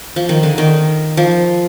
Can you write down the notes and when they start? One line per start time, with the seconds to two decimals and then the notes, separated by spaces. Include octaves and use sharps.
0.16 F3
0.29 D#3
0.43 D3
0.58 D#3
1.17 F3